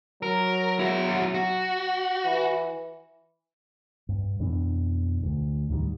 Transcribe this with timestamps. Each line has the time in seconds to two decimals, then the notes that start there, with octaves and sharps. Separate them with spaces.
0.23 F#3 A#4
0.79 E4 F#4
1.34 F#4
2.25 E3
4.09 G2
4.39 F2 B2 E3 D4
5.23 D2
5.69 D#2 A2 D#3 G3